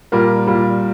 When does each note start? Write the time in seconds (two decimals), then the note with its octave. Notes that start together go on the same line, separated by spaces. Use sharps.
0.12 A#2 G3 A#4
0.47 A#2 G3